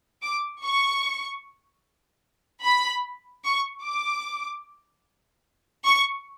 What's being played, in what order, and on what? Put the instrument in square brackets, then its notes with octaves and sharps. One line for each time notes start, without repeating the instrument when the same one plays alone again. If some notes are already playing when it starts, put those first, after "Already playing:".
[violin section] D6
C#6
B5
C#6
D6
C#6